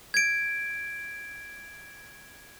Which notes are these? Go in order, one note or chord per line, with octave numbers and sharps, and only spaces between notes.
G#6 D7